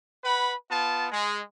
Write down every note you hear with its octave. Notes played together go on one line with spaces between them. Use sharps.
B4 F#5 B5
B3 F4 A5
G#3